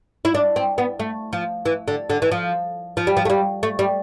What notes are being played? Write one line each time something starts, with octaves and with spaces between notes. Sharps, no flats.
E4
D4
C4
B3
A3
F3
E3
D3
D3
E3
F3
F3
G3
F3
A3
G3
A3
G3